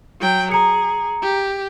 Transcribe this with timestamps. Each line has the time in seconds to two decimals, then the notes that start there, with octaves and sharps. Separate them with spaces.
0.20 F#3 G5
0.52 G#4 A#5 C#7
1.22 G4